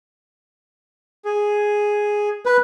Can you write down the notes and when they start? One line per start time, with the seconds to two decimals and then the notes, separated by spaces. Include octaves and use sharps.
1.25 G#4
2.46 B4